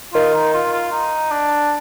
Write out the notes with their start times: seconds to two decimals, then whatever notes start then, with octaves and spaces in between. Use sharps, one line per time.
0.14 D#3 F4
0.34 D#4
0.54 F4
0.72 F4
0.92 D#4
1.31 D4